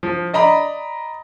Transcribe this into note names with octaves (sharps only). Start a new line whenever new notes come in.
F3
D5 D#5 A#5 B5